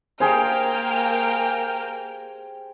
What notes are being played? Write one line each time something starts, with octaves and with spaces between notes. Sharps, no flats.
A#3 G4 G#4 C5 G5 F6